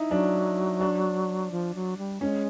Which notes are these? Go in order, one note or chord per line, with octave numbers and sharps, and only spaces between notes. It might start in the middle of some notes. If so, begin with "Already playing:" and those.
Already playing: D#4 E4
F#3 D4
D4
F3
F#3
G3
G#3 C#4